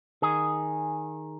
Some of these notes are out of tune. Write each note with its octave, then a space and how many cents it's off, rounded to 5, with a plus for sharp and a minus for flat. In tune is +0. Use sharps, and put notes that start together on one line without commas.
D#3 +0 G#4 +0